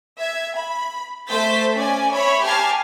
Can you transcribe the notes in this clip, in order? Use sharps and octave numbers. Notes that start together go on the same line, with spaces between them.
E5 G#6
B5
A3 C5 G6 A6 B6
C#4 D5 G#5
C#5 E5 B5
G4 G#5 A5 F6 G#6 C7